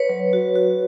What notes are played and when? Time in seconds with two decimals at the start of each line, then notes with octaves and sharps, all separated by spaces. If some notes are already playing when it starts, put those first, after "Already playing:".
Already playing: B4 C#5
0.09 F#3
0.33 F#4
0.55 F#4